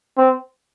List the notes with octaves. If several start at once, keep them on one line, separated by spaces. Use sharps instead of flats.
C4